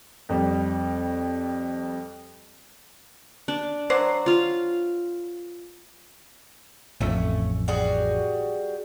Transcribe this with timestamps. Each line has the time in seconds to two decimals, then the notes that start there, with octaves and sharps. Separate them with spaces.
0.29 F2 G3
3.48 D4
3.90 F#3 C5 D5
4.26 F4 F5
7.00 A1 F2 A3 C#4
7.68 G3 F#4 G#4